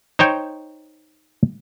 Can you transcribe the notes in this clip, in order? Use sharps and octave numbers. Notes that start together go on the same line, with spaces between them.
D#4 C5 C#5 G5